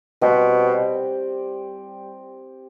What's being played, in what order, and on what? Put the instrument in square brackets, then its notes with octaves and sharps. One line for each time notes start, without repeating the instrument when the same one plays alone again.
[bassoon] B2 [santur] G3 C4 G4